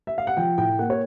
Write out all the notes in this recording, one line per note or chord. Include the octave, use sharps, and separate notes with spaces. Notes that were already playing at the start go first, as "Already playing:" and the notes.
E5
F5
F#5
F3 G5
A2 G5
A#3 F#5
C#5